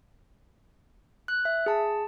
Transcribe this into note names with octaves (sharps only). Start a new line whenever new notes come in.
F#6
E5
G#4 A5